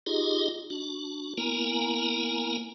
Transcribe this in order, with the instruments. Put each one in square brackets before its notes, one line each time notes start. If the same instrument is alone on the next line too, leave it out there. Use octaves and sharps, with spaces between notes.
[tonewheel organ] D#4 F4 G4 G#4 D#5
D4 F#4
A#3 B3 E4 A#4 G#5 A#5